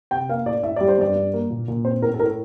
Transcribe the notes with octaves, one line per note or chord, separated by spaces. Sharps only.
C3 G5
A#3 F5
A2 D5
A2 E5
G3 D5
C5
G2 D5
G2
A#3
A#2
A#2
C4 C5
A2 A#4
A4
A2 A#4